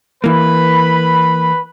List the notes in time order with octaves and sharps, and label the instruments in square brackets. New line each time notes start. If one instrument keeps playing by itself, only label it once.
[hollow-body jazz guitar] E3 A#3 [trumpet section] B4 B5